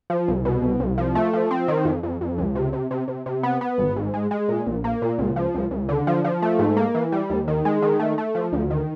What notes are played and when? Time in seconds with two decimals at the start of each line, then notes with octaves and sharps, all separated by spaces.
0.10 F3
0.28 C2
0.45 B2
0.62 C2
0.80 C2
0.98 F3
1.15 A3
1.33 F3
1.51 C4
1.68 D#3
1.85 F2
2.03 F2
2.21 F2
2.38 C#2
2.55 C3
2.73 C3
2.91 C3
3.08 C3
3.26 C3
3.43 B3
3.61 B3
3.78 G#1
3.96 G#2
4.14 G#3
4.31 G#3
4.49 A#2
4.66 A#1
4.84 A#3
5.02 A#2
5.18 C#2
5.36 F3
5.55 C#2
5.71 C#2
5.89 D3
6.07 F3
6.24 F3
6.42 A3
6.59 G#2
6.77 A#3
6.95 E3
7.12 G3
7.30 D#2
7.48 D#3
7.65 G#3
7.82 D#3
8.00 A3
8.18 A3
8.35 F3
8.53 D2
8.70 D#3